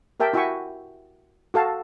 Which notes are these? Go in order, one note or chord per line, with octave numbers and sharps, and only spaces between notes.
G4 A#4 E5 G5 A5
E4 F#4 E5 G5 G#5 C#6
F#4 A4 F5 A5